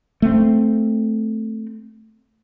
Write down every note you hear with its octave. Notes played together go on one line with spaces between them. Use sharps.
A3 C4